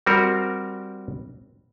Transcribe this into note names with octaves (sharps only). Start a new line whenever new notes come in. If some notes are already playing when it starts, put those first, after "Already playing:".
G3 C4 F#4 A#4